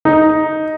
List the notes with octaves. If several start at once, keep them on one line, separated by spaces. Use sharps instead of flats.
D#4